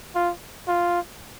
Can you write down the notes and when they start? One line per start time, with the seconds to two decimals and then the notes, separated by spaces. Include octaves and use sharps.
0.15 F4
0.68 F4